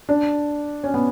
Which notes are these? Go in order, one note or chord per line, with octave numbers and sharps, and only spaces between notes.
D4
C#4
B3